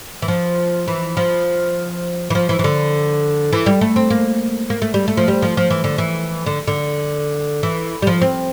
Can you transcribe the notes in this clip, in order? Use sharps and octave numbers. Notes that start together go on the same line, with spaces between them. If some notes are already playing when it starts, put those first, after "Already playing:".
E3
F3
E3
F3
E3
F3
E3
E3
D3
E3
G3
A3
C4
A#3
A#3
A3
G3
A3
F3
G3
F3
F3
E3
D3
E3
D3
D3
E3
G3
F3
C4